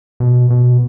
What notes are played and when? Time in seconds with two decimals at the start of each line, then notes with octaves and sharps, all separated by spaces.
0.20 B2
0.50 B2